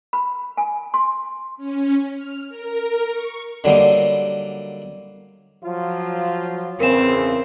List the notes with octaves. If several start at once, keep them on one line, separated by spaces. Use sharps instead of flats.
B5
G#5
C6
C#4
F6
A#4
C#6
D3 F#3 G3 A#3 D#4
F3 F#3 F4
E2 C#3 C4 A#4 E7